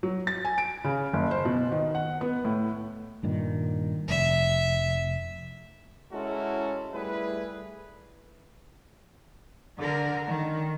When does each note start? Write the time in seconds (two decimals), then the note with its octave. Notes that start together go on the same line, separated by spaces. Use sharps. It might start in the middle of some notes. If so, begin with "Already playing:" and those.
0.03 F#3
0.27 A6
0.45 G#5
0.58 D7
0.84 C#3
1.13 F#1
1.31 C5
1.45 B2
1.72 D#3
1.95 F#5
2.21 B3
2.45 A2
3.23 G2 A#2 D#3
4.08 F1 E5
6.13 G#3 C#4 E4 F#4 A4 A#4
6.94 G3 A3 E4 G#4 B4
9.80 D3 A#4
10.28 D#3